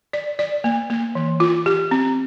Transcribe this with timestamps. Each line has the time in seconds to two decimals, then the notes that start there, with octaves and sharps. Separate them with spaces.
0.13 D5
0.39 D5
0.64 A#3
0.90 A#3
1.15 E3
1.40 F4
1.66 G4
1.91 C4